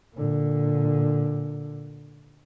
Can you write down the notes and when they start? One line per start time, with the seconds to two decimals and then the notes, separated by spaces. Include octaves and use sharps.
0.14 A#2 D3